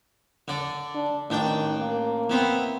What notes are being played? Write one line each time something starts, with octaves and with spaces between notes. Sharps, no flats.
D3 D5
D4
A1 D#3 D4 G5
A#3
E3 B3 C4